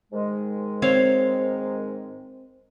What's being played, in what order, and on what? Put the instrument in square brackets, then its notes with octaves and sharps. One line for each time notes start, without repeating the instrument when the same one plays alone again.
[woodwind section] G#2 D#3 G#3
[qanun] C4 C#5 F5